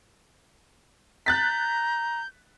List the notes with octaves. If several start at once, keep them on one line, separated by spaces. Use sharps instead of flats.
A#5 F#6 G6 A6 B6